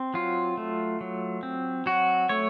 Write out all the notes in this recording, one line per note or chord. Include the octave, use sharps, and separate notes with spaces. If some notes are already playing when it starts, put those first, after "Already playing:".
Already playing: C4
F#3 F4
A3
F#3
C4
F#3 F#4
A3 C#5